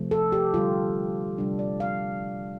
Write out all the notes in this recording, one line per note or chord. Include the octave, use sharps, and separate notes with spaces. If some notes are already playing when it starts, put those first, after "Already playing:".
Already playing: C3 F3 A3
A4
G4
D3 G3 F4
C3 G3 D4
D5
F5